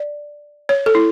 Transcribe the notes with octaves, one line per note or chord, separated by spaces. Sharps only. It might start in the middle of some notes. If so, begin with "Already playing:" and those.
Already playing: D5
C#5
A4
E4